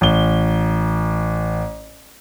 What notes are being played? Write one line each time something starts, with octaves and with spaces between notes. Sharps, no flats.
A1 G7